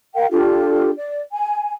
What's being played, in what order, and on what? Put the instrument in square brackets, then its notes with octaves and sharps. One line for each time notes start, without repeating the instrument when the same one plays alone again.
[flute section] A#4 F5 G5
D4 F4 G4 A4
D5
G#5